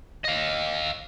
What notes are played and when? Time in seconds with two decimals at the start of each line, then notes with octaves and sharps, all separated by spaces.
0.25 D#5 F5